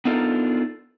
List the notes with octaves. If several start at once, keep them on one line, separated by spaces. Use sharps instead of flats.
B3 D4 D#4 F4 A4 A#4